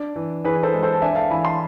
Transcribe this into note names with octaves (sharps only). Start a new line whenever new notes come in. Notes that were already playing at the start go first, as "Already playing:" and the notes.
Already playing: D4
E3
E3 G#4 B4
A4 C5
G#3
A4 C5
A5
D4 E5 G#5
F5 A5
E3 G#5 B5
A5 C6